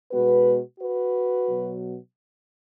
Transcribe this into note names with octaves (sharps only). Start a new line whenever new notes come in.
B2 G#3 B3 F#4 B4
F#4 B4
B2 F#3 B3